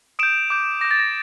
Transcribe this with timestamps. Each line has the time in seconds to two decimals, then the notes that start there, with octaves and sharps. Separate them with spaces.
0.19 D#6 G6 D7 E7
0.50 D6 G6
0.81 D6 G6 A#6
0.91 A6
1.00 A#6